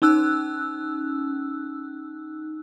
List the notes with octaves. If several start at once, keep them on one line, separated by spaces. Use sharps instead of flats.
C#4 D#4 E6 F#6